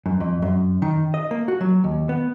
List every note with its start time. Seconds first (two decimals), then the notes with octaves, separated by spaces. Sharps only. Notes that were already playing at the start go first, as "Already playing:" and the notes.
0.06 F#2
0.20 F2
0.42 F#2
0.82 D#3
1.14 D#5
1.31 A#3
1.48 F#4
1.61 F#3
1.84 D#2
2.09 B3